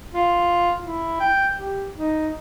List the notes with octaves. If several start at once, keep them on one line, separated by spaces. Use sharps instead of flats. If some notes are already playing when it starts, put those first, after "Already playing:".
F4
E4
G5
G4
D#4